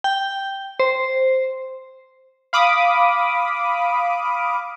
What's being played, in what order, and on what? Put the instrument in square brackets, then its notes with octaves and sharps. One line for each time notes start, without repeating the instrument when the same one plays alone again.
[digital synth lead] G5
C5
[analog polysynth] F5 B5 D6 D#6